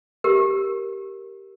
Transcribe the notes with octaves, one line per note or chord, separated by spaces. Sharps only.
G4 A#4